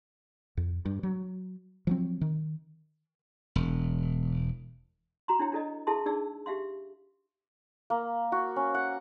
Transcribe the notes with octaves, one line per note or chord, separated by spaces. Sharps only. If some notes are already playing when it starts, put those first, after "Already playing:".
F2
G2
F#3
F3 F#3 C4
D#3
E1
F#4 A#5 C6
D4 E4 C#5 G5
D4 E4 A4 D5 D#5
E4 G#4 A4 E5 A5 C6
D4 D#4 G#4 D5 E6
G4 E5 F5 C6
A#3
F#4
C#4
F#5